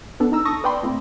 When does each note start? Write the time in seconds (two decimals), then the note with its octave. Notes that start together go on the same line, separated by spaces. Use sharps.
0.20 B3 D4 A4
0.32 D#4 A#5 E6
0.45 A5 C#6 D#6 A#6
0.64 B4 D5 G5 B5 C6
0.83 A#2 A3 C4